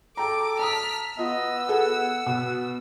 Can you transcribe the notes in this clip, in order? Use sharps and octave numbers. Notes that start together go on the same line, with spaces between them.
A4 G5 A#5 D6
A5 A#5 D#6 F6 B6
B3 F4 D#5 E6
G#4 A4 F#5
B2 B3